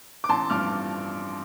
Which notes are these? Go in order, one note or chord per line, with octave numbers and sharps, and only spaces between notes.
D6
A1 A5 C6
G2 F3 D6 F6